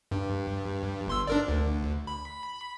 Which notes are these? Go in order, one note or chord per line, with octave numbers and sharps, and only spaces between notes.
G2
G1 C6 E6
D4 A#4 D5
D2
B5